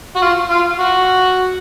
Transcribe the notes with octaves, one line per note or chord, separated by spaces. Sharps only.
F#4
F4
F4
F#4